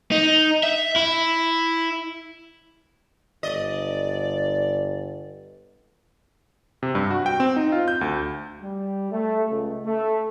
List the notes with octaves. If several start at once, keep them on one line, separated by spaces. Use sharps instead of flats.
D#4
E5
E4
G1 D5 D#5
C3
G2
F#4
G5
C4
D#4
F4
G6
D2
G3
A3
C#2
A3